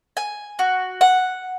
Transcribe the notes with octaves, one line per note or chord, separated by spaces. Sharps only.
G#5
F#4
F#5